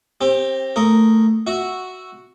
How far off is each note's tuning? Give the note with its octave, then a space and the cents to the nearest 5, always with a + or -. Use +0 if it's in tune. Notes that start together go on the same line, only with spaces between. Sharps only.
C4 +25 G4 +0
A3 +10 A#4 +0 D#6 +0
F#4 +0 E5 +0